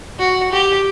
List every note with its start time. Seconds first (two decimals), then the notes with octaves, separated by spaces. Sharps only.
0.19 F#4
0.52 G4